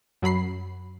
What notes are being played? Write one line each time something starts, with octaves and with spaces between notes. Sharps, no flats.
F#2 F#3 B5 C7